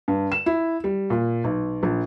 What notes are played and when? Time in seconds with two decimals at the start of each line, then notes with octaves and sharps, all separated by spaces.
0.08 G2
0.32 E7
0.46 E4
0.84 G3
1.10 A#2
1.44 B1
1.83 A#1